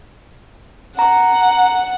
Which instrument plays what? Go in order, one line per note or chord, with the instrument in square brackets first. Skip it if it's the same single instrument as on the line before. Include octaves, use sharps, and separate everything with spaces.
[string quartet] F#5 [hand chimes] A#5